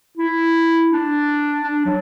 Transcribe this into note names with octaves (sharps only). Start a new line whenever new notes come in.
E4
D4
D4
F#3